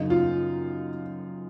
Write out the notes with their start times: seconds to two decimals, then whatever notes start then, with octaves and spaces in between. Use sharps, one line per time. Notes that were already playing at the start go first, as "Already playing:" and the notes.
Already playing: F#2 C#3 D#4
0.10 F4